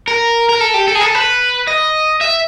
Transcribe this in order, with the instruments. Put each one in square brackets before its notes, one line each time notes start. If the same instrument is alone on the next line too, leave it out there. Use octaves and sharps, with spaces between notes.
[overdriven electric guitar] A#4
A#4
A4
G4
A4
G#4
A4
B4
D#5
E5